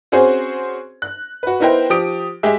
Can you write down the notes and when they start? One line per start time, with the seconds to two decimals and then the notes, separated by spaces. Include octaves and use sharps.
0.12 C4 C#4 F#4 G#4 C5
1.02 F#6
1.43 F#4 B4
1.60 B3 D#4 E4 A#4 C5 G5
1.90 F3 G4 D#6 D7
2.43 G#3 G4 G#4 E5